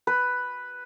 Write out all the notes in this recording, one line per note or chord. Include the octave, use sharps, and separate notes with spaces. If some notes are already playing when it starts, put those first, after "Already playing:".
B4